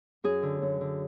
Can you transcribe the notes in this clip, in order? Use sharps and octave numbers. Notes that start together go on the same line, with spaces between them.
F#2 G#4
D3
F#2
D3